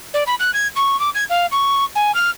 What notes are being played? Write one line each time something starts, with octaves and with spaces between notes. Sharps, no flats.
D5
B5
F#6
G#6
C#6
D6
G#6
F5
C#6
G#5
F6